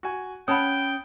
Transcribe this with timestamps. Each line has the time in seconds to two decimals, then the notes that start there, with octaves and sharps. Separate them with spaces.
0.03 F#4 G#5
0.48 C#4 C#5 F#5 G5 A5 B5 D#6